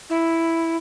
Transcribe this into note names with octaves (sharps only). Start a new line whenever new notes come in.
E4